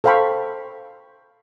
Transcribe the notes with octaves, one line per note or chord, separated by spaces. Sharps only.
A4 C5 F5 G5 B5 C#6